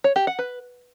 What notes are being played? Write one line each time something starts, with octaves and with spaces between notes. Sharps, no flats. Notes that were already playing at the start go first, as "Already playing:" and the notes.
C#5
G4
F#5
B4